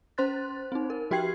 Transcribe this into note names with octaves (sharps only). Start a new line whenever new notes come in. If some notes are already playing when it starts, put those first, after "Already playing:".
C#4 C5 C6 F#6 A6
C4 D#4
A#4
F3 F#4 G4 G5 G#6 C7